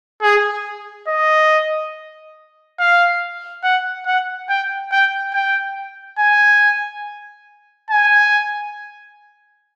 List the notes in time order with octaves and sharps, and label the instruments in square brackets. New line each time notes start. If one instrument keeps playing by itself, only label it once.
[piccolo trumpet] G#4
D#5
F5
F#5
F#5
G5
G5
G5
G#5
G#5